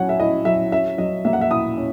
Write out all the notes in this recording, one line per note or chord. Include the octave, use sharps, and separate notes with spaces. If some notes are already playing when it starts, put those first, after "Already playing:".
Already playing: F#3 C#4 E4 F#5 G#5
E5
E4 D#5
F#3 E5
C#4 E5
F#3 D#5
A#3 E5
F#5
E5
E4 D#6
C#4